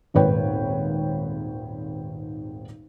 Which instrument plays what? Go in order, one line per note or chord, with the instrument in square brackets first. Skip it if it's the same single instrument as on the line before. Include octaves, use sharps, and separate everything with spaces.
[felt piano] D#1 G#1 G#2 B4 C#5 G5